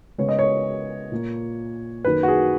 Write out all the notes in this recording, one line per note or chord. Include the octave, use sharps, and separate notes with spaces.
C#3 G#3 B3 C#5
D#5
C#5
A#2 A#3
F#2 D#3 A#3 B4
F#4
G#4